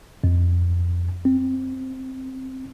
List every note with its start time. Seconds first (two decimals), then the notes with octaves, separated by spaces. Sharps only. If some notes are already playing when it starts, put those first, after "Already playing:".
0.24 F2
1.25 C4